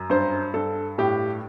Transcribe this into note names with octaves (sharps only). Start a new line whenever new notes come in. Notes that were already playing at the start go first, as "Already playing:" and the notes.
Already playing: F#2
G2 C5
G2 A4
A2 G4